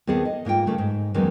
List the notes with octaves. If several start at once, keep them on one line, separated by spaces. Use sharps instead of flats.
D#2 B3 C4 G#4 A4
D#5
G#2 A#3 F4 G5
C#3 A3 A#3
G#2
E2 D#3 F#3 G#3 A#3 C#4